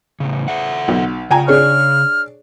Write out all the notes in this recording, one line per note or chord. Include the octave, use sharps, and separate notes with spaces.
A2 C#3
A4 E5 F#5
B1
C#3 G5 G#5 A#5
D4 G#4 C#5 F6